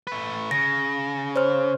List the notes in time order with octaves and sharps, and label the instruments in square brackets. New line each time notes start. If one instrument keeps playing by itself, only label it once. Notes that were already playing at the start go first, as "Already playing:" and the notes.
[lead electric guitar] A3 B4
[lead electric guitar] C#3 [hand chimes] A#6
[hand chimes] C5 C#5 F6